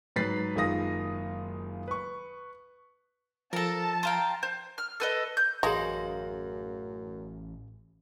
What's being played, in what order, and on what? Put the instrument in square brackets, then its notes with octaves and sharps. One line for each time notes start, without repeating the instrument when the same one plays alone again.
[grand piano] G#2 F#3 B4 A6 B6 C7
F#1 D#3 G#3 F4 D#6 A#6
B4 C#6
[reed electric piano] F3 [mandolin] A4 A#4 [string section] A5
[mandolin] C5 F5 G5 [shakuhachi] A#5
[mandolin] C5
F6
A4 B4 D#5
G6
[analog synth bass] A1 [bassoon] F#2 [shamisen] G#3 [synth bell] G#4 F5 A#6